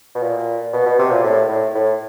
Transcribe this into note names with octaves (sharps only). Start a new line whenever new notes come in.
B2
A#2
B2
B2
C3
A#2
A2
A2
A2